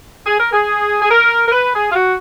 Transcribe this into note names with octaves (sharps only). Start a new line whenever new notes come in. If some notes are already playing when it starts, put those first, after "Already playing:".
G#4
A#4
G#4
G#4
A#4
A#4
B4
G#4
F4
F#4